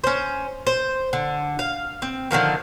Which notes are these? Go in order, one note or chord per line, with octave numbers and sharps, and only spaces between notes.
C#4 C5
C5
D3
F5
C4
D3 D#3 F3 A#4